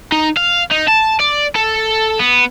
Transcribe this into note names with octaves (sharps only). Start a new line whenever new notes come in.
D#4
F5
D#4
A5
D5
A4
B3